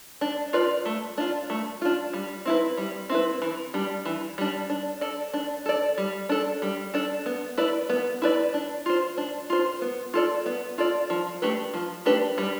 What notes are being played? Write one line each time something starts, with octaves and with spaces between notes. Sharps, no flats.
D4
F4 B4 D5
A3
D4 F4
A3
D4 F4
G3
C4 E4 B4
G3
C4 E4 B4
E3
G3 D4
E3
G3 D4
D4
A4 D5
D4
A4 D5
G3
D4 A4
G3
D4 A4
B3
E4 B4 D5
B3
E4 B4 D5
D4
F4 C5
D4
F4 C5
B3
F4 A4 D5
B3
F4 A4 D5
F3
A3 D4 G4 B4
F3
A3 D4 G4 B4
G3